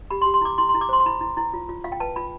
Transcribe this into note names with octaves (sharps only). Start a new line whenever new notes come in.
G4 B5
C6
G4
C6
E4 D6
E4 C6
C6
E4
D6
C5 C6
C6
E4 B5
E4
E4
F4
F4
F4 F5
G5
B4 A5
F4 B5